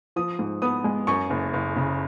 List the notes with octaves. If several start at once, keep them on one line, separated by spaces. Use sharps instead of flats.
F3 D#6
G#2
B3 D#6
G#3
F#2 C#6
F#1
F#1
C#3